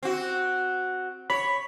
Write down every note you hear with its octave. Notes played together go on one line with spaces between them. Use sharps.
C4 F#4
C#5 B5